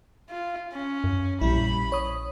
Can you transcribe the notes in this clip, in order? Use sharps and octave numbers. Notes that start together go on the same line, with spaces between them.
F4
C#4
F#2
A#1 A#2 G3 E4 B5
C#5 D#6